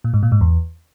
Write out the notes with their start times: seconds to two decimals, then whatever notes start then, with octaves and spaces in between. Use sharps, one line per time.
0.04 A#2
0.14 G#2
0.23 A#2
0.32 G#2
0.41 E2